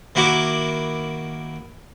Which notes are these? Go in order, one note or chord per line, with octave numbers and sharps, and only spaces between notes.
D#3 A#3 E4 F#4 F#5 D6